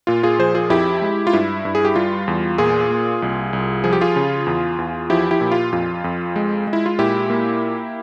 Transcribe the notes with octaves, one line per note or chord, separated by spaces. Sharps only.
A#2 F4
F4 G#4
F3 G#4 C5
F4 G#4
F2 E4 G4
G#3
F4
G2 E4
G2
G#4
G4
G3 F4
E2
A#2 F4 G#4
A#3
C2
C2
F3 G#4
G4
F4 G#4
C#3
E2
E2
F3 E4 G4
E4 G4
A#2
F4
F2 F4
F2
G#3
G#3
E4
F4
A#2 E4 G4
A#3